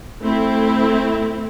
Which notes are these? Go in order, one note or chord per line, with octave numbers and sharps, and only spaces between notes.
A3 C4 E4